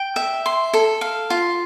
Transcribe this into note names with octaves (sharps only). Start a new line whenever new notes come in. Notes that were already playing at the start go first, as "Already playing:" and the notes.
Already playing: G5
E5
C6
A4
F5
F4